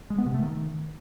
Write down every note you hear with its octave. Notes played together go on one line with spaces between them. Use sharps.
G#3
B3
C3
A3
D#3